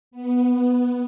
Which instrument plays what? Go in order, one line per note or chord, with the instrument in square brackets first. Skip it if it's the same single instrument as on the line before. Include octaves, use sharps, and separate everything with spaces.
[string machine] B3